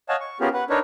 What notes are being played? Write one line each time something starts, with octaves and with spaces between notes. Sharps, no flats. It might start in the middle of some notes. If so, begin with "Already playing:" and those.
C#5 D#5 F5 F#5 G#5 A5
C#6
B3 C#4 F4 G4 G#4 A#4
B4 F#5
D4 D#4 A#4 B4 C#5